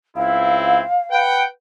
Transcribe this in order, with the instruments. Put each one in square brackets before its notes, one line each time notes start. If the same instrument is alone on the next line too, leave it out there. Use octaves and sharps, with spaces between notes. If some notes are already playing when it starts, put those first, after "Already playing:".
[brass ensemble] C#2 C4 E4 [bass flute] F5
[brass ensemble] B4 F#5 G5